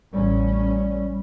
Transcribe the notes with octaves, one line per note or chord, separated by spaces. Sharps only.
A1 G3 C#4